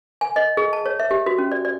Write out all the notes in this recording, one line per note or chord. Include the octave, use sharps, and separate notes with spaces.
G#5
D#5
G#4
A5
C#5
E5
G4
F#4
C#4
D5
D5